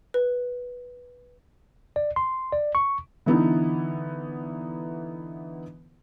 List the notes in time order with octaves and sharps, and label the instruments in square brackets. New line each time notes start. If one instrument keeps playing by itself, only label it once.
[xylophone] B4
[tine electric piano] D5
C6
D5
C#6
[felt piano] D3 E3 B3 D#4 E4 B4